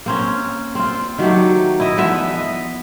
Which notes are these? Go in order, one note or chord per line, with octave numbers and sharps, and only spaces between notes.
A#3 C4 C#4
C4 F4
D#3 F#3 A3 G4
E4 D#5 E5
E3 F3 B3 E5
D#5